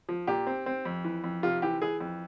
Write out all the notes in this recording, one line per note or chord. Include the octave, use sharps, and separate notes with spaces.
F3
A#2 G4
C4
C4
F2
E3
F2
C3 F4
E3 G4
E3 G#4
F2